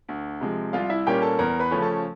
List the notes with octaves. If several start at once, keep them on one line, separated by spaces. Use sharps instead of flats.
D2
C3 F3 G#3
C2 F4 F5
E4 E5
A#2 G3 A#3 C#4 G4 G5
A4 A5
E2 A#4 A#5
B4 B5
C#3 F3 A3 C#4
A4 A5